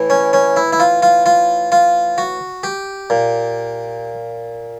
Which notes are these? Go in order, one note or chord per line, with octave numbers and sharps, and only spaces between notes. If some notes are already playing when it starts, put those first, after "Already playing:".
Already playing: A2 E3
C#4
C#4
E4
E4
F4
F4
F4
F4
F#4
G4
A#2